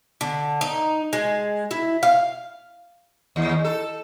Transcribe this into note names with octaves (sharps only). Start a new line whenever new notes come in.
D3
D#4
G#3
E4
F5
D#2
A4